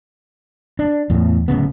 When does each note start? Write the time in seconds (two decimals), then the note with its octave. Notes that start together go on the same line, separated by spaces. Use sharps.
0.79 D4
1.10 E2 A2
1.48 D1 E2 C#3 B3